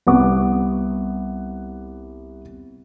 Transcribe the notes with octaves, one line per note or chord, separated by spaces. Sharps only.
C2 B3 F#5 D6